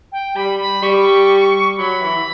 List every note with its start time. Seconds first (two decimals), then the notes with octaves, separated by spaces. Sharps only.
0.12 G5
0.35 G3 B5
0.60 B5
0.82 G3 C#6
1.78 F#3 B5
2.01 E3